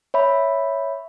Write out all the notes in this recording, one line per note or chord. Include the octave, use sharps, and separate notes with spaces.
C#5 E5 B5